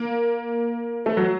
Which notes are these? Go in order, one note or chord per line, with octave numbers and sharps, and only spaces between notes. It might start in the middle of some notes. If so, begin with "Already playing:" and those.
Already playing: A#3
A3
F#3